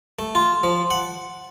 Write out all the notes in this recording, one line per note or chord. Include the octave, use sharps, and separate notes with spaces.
A3
F4
F3
F#5